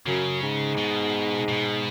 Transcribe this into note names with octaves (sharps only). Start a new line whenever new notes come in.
F#2 C#3
G#2
B2
B2